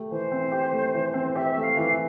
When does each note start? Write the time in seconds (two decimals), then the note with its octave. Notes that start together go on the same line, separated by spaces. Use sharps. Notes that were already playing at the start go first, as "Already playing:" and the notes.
Already playing: A3 G4
0.11 E3 C5
0.32 C4
0.52 G4
0.72 A3
0.94 E3
1.14 C4
1.35 G4 E5
1.56 A3
1.63 F5
1.77 E3
1.90 E5